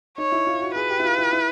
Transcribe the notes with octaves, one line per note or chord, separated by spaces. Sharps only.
D#4 C#5
E4
F4
F#4
G#4 B4
G4
E4
F4
E4
E4